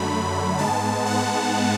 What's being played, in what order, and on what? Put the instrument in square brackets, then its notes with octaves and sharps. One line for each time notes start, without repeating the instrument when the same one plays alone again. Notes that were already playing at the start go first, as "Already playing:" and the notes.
Already playing: [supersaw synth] F#2 D3 F#3 A3 B5
G#2 G#3 B3 A5
F#5